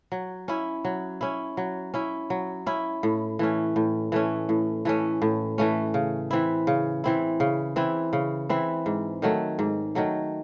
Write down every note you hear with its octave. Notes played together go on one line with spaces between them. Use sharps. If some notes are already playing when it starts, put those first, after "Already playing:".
F#3
C#4 E4
F#3
C#4 E4
F#3
C#4 E4
F#3
C#4 E4
A2
E3 A3 C#4
A2
E3 A3 C#4
A2
E3 A3 C#4
A2
E3 A3 C#4
C#3
E3 C4 E4
C#3
E3 C4 E4
C#3
E3 C4 E4
C#3
E3 C4 E4
G#2
D#3 F#3 A3
G#2
D#3 F#3 A3